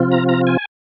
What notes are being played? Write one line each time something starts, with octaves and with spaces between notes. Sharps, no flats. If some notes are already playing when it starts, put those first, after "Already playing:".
Already playing: C3 F3 C4 F4
A#5
A#5
G#5